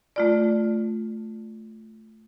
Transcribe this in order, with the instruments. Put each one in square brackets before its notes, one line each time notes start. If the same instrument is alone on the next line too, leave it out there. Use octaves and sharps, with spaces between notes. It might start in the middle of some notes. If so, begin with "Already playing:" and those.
[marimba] A3 F4 D5